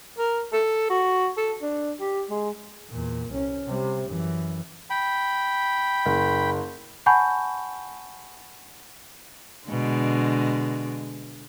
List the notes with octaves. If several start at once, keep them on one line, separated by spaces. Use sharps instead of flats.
A#4
A4
F#4
A4
D4
G4
G#3
E2 A#2
C2 C#4
C3 G3
F#2 E3
G5 B5
F#1
F#5 G#5 A5 B5 C#6 G6
B2 D3 G#3